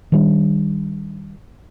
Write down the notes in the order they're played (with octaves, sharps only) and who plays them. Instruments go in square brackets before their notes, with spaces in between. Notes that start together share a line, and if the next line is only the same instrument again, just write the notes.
[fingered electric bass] D#3 G3 D4